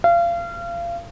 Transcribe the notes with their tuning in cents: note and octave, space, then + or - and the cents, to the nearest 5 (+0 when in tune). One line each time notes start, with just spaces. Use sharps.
F5 -30